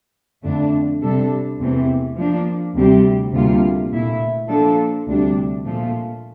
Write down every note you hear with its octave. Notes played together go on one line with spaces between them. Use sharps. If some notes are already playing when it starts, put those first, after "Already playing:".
F2 D3 A3 D4
C3 G3 D4 A4
E2 C3 E3 A3 C4
F3 A#3 D4
D2 C3 G3 C4 G4
D2 C3 G3 A#3 F4
A#2 A3 E4
F3 A#3 D4 A4
D2 C3 G3 D4
A#2 F3 A3